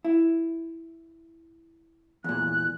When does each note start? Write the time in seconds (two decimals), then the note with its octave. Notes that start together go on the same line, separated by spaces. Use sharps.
0.05 E4
2.24 E2 A#2 F#6